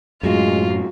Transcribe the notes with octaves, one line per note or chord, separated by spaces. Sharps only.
F#2 A2 G#3 F4 F#4